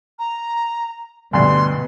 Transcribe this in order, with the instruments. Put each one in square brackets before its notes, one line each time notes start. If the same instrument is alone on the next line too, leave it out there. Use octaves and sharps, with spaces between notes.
[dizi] A#5
[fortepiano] D2 G2 [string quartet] B2 [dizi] C6